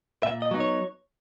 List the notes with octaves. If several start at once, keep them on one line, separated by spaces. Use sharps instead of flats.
A#2 E5
D#5
F#3 B3 D#4
C#5